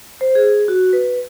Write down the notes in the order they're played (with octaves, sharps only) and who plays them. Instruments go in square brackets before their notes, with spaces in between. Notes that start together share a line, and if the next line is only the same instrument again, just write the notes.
[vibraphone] C5
G#4
F#4
B4